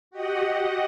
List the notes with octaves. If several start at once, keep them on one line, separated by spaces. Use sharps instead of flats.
F#4 G4 D#5 F#5